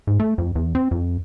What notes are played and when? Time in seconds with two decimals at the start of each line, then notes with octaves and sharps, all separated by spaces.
0.07 G#2
0.20 A3
0.38 F2
0.56 E2
0.75 C4
0.91 F2